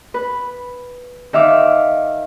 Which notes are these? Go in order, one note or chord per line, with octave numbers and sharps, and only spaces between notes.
B4
D#3 E5 F5 D6